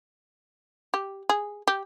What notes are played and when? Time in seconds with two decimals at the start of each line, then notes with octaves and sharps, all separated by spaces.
0.94 G4
1.29 G#4
1.67 G4